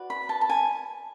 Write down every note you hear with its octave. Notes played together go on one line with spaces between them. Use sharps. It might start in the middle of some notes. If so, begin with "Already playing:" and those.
Already playing: F#4 B4 D5
B5
A5
A5
G#5